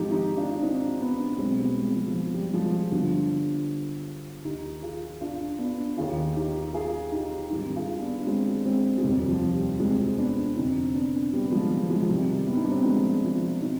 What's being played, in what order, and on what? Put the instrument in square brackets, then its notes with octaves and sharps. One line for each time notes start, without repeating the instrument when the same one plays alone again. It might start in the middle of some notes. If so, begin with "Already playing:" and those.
Already playing: [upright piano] G#1 G#2 F3 D#4 G4
D#4 G4
D4 F4
D4
C4 D#4
B3 D4
B1 B2 G#3 C4
G3 B3
G#3 C4
F3
F3
G3
F3 G#3
G1 G2 D3 F3
D#2 D#3 D#4 G4
F4 G#4
D4 F4
B3 D4
D#2 D#3 F4 G#4
D#4 G4
F4 G#4
D#4 G4
G#1 G2 D#3 D#4 G4
F4 G#4
B3 D4
G#3 C4
G#3 C4
G#3
F1 D#2 D#3 G3
F3
G3
G#3 C4
B3 D4
F1 F2 D3 C4 D#4
B3 D4
G3 B3
B3
F3 G#3
F3
F3 G#3
C2 C3 D#3 G3
G3 B3
D#4
D4
C4
B3
F3 G#3
F3
B2 C4 D#4